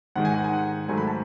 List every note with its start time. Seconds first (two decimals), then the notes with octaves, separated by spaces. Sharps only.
0.16 G#2 D#3 G#3 F#5
0.25 G#5
0.34 F#5
0.44 G#5
0.53 F#5
0.88 G#2 D#3 F#3 A3 G#5
0.98 B5
1.07 A5